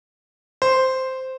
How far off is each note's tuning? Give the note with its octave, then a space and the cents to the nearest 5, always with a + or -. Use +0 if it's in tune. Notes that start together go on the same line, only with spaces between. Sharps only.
C5 -5